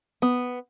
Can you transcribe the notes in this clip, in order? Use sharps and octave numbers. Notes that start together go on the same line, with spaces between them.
B3